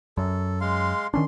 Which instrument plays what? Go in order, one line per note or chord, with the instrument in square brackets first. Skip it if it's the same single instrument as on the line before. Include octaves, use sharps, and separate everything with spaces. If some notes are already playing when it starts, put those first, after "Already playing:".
[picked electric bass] F#2 [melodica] A4
[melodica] G#3 F5 C6
[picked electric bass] D#3 C#4 D4 [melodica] C6